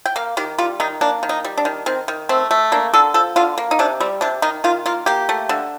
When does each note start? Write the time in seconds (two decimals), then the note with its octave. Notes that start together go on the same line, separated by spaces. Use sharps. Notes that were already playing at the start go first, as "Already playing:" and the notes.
0.06 G5
0.16 A#3 F5
0.37 D#3 G4
0.58 G3 F4
0.80 D#3 D#4
1.01 A#3 D4
1.23 D#3
1.29 D#4
1.44 G3
1.58 D4
1.65 D#3
1.86 D#3 C4
2.08 D#3
2.29 A3 C4
2.51 A3
2.72 A#3 D4
2.94 D3 A4
3.14 F3 A4
3.36 D3 F4
3.58 A#3
3.71 D#4
3.79 C3 D4
4.00 G3 C4
4.21 C3 D4
4.42 D#3 D#4
4.64 D#3 F4
4.86 A#3 F4
5.06 A#3 G4
5.29 A3
5.49 D3